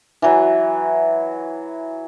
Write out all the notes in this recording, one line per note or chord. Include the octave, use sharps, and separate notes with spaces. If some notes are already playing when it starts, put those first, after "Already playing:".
E3 F#3